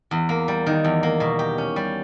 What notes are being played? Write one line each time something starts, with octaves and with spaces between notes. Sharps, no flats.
E2
A#3
G3
D#3
E2
A#3
B2
G4
C#4
G3